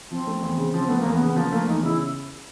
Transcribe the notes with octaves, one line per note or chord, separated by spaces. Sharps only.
F3 C4
A3
E2
C#3
F3 C4
A3 B3
E2 A#3
B3
C#3
F3 A#3
A3 A#3
E2 D#4
C#3 E4